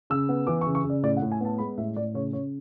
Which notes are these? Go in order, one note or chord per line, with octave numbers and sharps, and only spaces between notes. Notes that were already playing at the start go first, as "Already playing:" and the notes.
C#3 E6
B3
E3 D6
C#6
C#3
C#6
C#3
D5
A2 D5
F#5
A2
G#5
B3 A5
G#3 B5
A2 E5
A2 D5
C#3 C#5
C#3 C#5